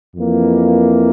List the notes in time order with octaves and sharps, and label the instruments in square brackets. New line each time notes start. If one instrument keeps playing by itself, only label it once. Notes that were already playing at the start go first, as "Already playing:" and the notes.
[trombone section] F2 E3 A#3